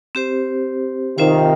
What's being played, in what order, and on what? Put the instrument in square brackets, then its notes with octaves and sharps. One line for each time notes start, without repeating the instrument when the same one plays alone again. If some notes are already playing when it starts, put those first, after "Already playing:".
[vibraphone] C4 G4 C5
[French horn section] C3 D#3 [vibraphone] C4 F4 C5 F5